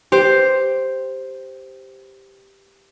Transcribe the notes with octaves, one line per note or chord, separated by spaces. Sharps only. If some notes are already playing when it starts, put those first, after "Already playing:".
G4 C5